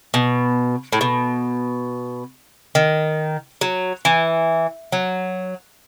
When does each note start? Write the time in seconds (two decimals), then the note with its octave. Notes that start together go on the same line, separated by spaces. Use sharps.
0.14 B2
0.92 A2
1.01 B2
2.75 D#3
3.61 F#3
4.05 E3
4.92 F#3